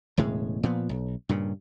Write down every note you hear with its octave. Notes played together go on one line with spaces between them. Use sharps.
E1 A2 C#3 G#3
A#2 F3 B3
B1
G2 A#2 C#3